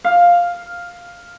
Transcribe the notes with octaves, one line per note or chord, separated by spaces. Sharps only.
F5